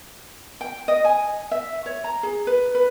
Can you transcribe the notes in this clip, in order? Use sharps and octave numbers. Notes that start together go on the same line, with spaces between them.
G5
D#5
G#5
E5
C#5
A#5
G#4
B4
B4